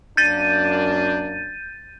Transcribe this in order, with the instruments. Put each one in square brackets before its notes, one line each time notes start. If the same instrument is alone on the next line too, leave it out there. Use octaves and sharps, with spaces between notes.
[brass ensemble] F#2 A#3 D4 [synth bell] G6 A6 D#7